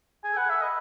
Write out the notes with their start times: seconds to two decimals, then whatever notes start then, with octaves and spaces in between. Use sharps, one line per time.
0.23 G#4 G#5
0.32 A4
0.37 B4 F#5
0.49 A4 E5
0.62 B4 D#5